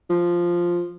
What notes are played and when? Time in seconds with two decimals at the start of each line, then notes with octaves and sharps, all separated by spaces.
0.10 F3